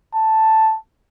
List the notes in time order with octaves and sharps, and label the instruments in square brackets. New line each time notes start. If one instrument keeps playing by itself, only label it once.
[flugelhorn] A5